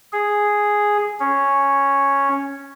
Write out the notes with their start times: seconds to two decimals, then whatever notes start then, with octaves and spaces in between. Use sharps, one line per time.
0.13 G#4
1.20 C#4